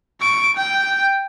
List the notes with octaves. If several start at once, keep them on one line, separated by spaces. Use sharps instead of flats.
C#6 D7
G5